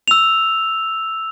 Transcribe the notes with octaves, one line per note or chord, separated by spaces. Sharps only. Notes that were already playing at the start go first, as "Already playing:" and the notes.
E6 F7